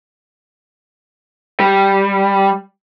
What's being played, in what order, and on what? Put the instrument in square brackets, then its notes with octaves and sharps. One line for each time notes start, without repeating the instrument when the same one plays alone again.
[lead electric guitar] G3